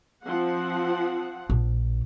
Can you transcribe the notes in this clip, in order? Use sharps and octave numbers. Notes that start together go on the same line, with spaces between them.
F3 C4 F#5
A#1